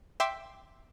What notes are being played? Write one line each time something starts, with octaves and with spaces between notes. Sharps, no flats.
E5 G5 C6 D6